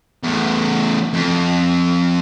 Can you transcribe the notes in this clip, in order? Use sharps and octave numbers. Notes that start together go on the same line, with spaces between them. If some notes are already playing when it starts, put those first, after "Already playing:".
E2 A2
F2